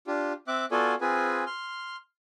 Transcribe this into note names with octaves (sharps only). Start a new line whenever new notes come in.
D4 F4 G4
C4 E5 D6 F#6
B3 F4 F#4 A4 D5 G#5
C4 F4 G#4 B4 G#5
C6 F6